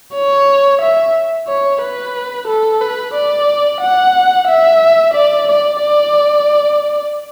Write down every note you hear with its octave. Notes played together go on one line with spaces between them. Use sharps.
C#5
E5
C#5
B4
A4
B4
D5
F#5
E5
D5
D5
D5